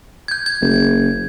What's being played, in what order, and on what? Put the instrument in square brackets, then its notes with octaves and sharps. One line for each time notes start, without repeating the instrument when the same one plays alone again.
[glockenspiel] G6 G#6
G#6
[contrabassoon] F#1